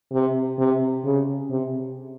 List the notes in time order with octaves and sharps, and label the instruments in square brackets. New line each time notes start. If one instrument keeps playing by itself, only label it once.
[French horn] C3
C3
C#3
C3